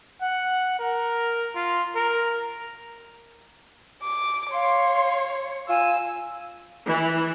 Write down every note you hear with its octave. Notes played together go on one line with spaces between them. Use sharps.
F#5
A#4
F4
A#4
D6
C#5 F5 C6
F4 G#5 E6
E3